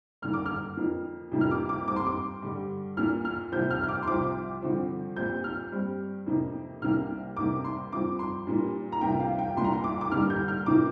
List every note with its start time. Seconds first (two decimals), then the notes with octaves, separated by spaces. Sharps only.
0.22 G2 D3 A#3 F6
0.34 D6
0.46 F6
0.77 F2 F3 A#3
1.32 F2 C3 G3 A#3
1.41 F6
1.51 D6
1.69 D6
1.87 G2 G3 C4 D6
1.96 C6
2.06 D6
2.42 G2 D3 G3
2.97 A#2 A#3 F6
3.25 F6
3.52 C2 C3 F3 C4 G6
3.70 F6
3.83 F6
3.88 D6
4.02 C6
4.07 C2 C3 F3 C4 D6
4.62 G2 D3 F3 C4
5.16 A#2 G3 C4 G6
5.44 F6
5.72 G2 G3 C4
6.26 F2 C3 F3 A#3
6.82 C2 C3 A#3 F6
7.37 C2 C3 A#3 D6
7.64 C6
7.92 G2 F3 C4 D6
8.19 C6
8.47 A#2 G3 A#3
8.92 A#5
9.01 C2 C3 F3 A#3 G5
9.20 F5
9.39 G5
9.57 C2 A#2 A#3 C6
9.64 A#5
9.73 C6
9.84 D6
10.01 D6
10.11 G2 D3 G3 A#3 F6
10.30 G6
10.48 F6
10.66 C3 F3 A#3 D6